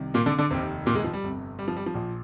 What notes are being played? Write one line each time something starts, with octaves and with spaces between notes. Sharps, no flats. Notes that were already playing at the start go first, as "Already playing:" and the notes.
Already playing: C2 C3 D#3
A#2 A#3
D3 D4
D3 D4
F1 D#2 C3 D#3 C4
A#2 A#3
G#2 G#3
F3
G3
G1 F2 C3
G3
F3
G3
F3
A#1 A#2